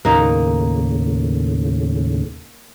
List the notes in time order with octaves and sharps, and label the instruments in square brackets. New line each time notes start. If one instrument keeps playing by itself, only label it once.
[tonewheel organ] D#2 A2 C#3 [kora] A#3 D#4